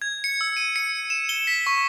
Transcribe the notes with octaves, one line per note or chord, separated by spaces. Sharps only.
G#6
C#7
E6
D#7
C#7
E7
G7
B6
C#6